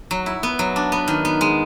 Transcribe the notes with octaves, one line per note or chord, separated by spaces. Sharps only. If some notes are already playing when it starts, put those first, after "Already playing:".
F#3
E4
B3
F#3
D4
B3
D#3
B3
G#3